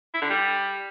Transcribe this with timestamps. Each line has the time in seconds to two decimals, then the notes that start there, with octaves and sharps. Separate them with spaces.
0.14 E4
0.22 D3
0.30 G3